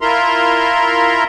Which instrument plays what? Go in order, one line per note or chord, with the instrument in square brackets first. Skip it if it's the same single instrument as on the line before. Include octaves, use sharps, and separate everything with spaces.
[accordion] E4 F4 A#4 E5 A#5 C6